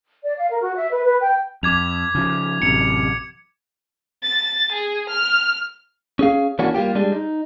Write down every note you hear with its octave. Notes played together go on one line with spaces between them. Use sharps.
D5
F5
A#4
F#4
E5
B4
B4
G5
F2 D6 G#6 F7
C#3 F3
A1 F#2 C3 C#7 F7
A6
G#4
F6
C#4 G#4 F5
E3 A#3 C#4 D4 F#4
G3 A#3 F4 G4
G3 G#3 D4
D#4